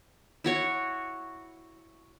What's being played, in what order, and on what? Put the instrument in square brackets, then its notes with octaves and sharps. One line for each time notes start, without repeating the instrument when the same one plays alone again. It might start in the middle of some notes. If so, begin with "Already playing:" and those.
[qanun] E4 F#4 C#5